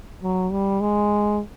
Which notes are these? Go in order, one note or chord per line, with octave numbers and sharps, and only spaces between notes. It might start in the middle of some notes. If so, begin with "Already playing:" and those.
F#3
G3
G#3